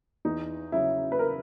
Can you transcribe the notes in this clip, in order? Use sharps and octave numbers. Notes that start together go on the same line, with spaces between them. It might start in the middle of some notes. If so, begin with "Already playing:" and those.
E2 D#4
C#3 F#3 E4
B4
A#4